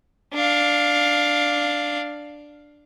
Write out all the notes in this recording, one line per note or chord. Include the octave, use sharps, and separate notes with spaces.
D4 F5